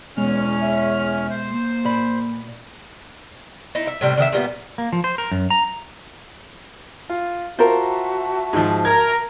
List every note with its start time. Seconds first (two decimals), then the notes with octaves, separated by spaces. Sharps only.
0.17 E2 B2 G#3 C#4 F6
0.61 E5
1.30 C5
1.49 A#3
1.85 A#2 D5 B5
3.75 D#4 E4
3.87 E5
4.01 A2 C3 G3
4.17 D3 D#3 D#5 E5
4.32 A#2 G3 A#3 B3
4.78 A#3
4.93 F3
5.04 C5
5.18 A#4
5.32 F#2
5.50 A#5
7.10 F4
7.59 F4 F#4 A#4 C5 E5 A5
8.53 G#2 F3
8.85 A#4 G#6